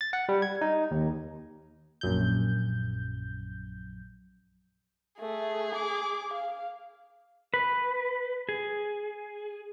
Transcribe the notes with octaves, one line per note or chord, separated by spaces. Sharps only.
A6
F#5
G3
G#6
D#4
D#2
A#1 F#2 G6
A3 G#4
D6
F5
B4
G#4